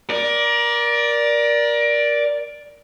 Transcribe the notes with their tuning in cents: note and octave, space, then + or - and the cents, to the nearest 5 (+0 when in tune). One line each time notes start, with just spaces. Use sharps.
A#4 +25 D5 +0